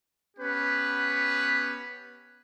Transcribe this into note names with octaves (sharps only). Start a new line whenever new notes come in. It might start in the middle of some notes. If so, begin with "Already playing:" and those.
B3 C#4 G4 B4